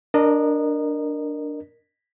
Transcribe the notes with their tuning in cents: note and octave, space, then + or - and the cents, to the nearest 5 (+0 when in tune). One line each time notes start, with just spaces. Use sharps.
D4 +0 A#4 +0 D#5 -25